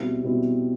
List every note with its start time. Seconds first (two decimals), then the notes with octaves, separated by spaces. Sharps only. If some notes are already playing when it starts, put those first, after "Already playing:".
Already playing: B2 G3 C4 E4
0.23 B2 G3 C4 E4